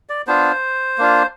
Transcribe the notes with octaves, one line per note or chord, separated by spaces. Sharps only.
D5
B3 D4 F4 C5
A#3 D4 F4